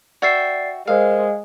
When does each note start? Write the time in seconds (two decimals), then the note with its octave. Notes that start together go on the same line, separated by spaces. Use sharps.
0.22 F#4 D5 E5 G5 A6 C7
0.87 G#3 A#4 C5 F5